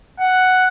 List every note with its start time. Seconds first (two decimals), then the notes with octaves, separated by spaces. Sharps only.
0.20 F#5